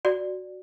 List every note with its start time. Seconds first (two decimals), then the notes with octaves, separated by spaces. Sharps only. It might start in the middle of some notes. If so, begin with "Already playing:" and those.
0.05 F#4 D5